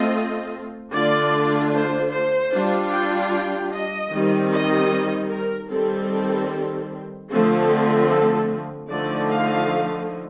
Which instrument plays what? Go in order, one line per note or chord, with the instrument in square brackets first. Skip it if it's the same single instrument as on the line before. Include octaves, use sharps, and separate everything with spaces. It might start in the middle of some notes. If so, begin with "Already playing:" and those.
Already playing: [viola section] A3 C4 F4 D#5
D3 A3 D4 F4 D5
C5
C5
G3 D4 F4
G5
G5
D#5
D#3 G3 C4 D#4
D#5
A#4
D#3 G3 C4 A4
D3 F3 A3 C4 A4
A4
D3 F3 A3 D#4 D5
F5